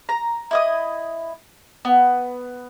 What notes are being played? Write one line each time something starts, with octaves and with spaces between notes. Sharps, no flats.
A#5
E4 D#5 D#6
B3